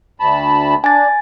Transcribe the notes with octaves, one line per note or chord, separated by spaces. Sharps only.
D2 A5 B5
D4 G#5 A6